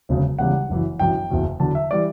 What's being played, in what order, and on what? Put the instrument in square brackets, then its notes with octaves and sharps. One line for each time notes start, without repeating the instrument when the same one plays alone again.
[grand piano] E1 D2 C#3 F#3
E1 E2 C#3 E3 G3 F#5
F#1 F#2 E3
G1 F#2 E3 G5
F#1 E2 B2
E2 D3 F#3 A5
E5
E3 G3 D5